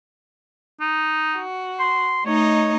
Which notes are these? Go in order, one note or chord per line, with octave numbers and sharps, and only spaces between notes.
D#4
F#4
C6
A3 D#4 C#5 D#5